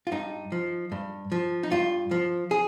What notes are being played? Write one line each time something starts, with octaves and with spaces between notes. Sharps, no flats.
F4
G2 D#4
F3
G2
F3
D#4
G2 F4
F3
G#4